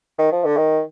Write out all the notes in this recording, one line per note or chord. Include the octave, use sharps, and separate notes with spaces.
D#3
F3
D3
D#3